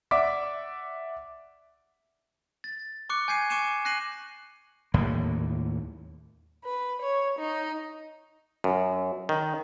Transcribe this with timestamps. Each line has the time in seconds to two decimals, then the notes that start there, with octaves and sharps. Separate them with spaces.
0.11 D5 E5 F#5 D6 B6
2.64 A6
3.09 C#6 D6 F#6 C#7
3.28 G#5 G6 G#6 C7 D#7
3.50 G#5 C#6 D6 C#7 D#7 E7
3.85 F#6 A#6 C7 D#7 F#7
4.94 D#2 A2 A#3
6.66 B4
7.03 C#5
7.39 D#4
8.64 F#2
9.29 D#3